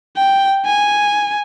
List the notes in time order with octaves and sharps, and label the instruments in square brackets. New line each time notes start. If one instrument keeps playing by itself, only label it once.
[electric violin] G5
G#5